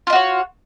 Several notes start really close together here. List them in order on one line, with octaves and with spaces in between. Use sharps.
F4 D#5 F#4 C#5